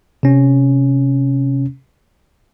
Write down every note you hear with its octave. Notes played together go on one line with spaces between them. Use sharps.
C3 C#4